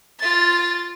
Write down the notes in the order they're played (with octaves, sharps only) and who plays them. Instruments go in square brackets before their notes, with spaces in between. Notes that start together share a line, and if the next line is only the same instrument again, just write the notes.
[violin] F4 A6